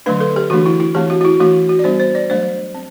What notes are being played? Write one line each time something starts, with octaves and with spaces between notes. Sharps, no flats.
D3 F#3 A3 D4 B4
A4
G4
E3 A3 D4 F#4
E4
E4
E3 A3 C4 G4
F#4
F#4
E4
E3 A3 D4 F#4
F#4
D5
G3 B3 D4 C5
C5
D5
F#3 A3 D4 C5
C4